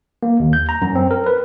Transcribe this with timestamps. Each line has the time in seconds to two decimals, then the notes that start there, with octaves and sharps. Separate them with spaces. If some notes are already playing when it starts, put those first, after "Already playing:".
0.23 A#3
0.40 D#2
0.53 G6
0.69 A#5
0.82 F#2
0.95 C4
1.11 A#4
1.26 B4